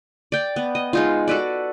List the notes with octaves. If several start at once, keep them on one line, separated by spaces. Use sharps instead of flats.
D5 G5
B3
D#5
G#3 D#4 F4
F#4 A4 B4 D5